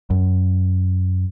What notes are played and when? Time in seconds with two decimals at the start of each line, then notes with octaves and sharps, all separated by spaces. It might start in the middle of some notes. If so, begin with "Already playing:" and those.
0.10 F#2